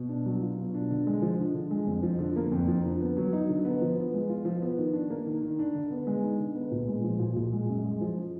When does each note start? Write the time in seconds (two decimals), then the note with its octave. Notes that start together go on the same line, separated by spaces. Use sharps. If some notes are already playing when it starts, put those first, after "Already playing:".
Already playing: B2
0.09 D4
0.26 F#3
0.42 F4
0.58 B2
0.74 D4
0.91 D3
1.07 G#3
1.22 F3
1.38 D3
1.54 D3
1.71 G#3
1.87 F2
2.03 F3
2.19 D3
2.36 A#3
2.52 F2
2.68 F3
2.85 D3
3.00 B3
3.17 F#3
3.33 D#4
3.49 D3
3.65 B3
3.81 F3
3.97 B3
4.14 G#3
4.29 F4
4.45 F3
4.62 B3
4.78 D#3
4.93 D4
5.10 A#3
5.26 D#3
5.42 D#3
5.59 D4
5.75 D3
5.91 B3
6.07 G#3
6.22 D#4
6.40 D3
6.55 B3
6.71 A#2
6.88 G#3
7.04 F3
7.19 A#2
7.36 A#2
7.53 G#3
7.68 F#2
7.84 G#3
8.01 F3